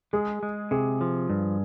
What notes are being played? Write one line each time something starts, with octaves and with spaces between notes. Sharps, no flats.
G#3 G#4
G#3
C3 G#4
F3
G2